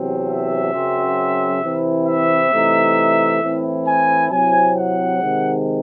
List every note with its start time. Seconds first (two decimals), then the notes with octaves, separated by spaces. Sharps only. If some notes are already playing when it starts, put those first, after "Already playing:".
Already playing: E2 C3 F#3 C4
0.27 E5
0.73 F#2 C#3 F#3 C4
1.62 C3 E3 C4 E4
2.07 E5
2.51 C3 E3 A3 D#4
3.41 A2 E3 C4 E4
3.85 G#5
4.30 C3 F#3 C4 E4 G#5
4.75 F#5
5.19 C3 D#3 G#3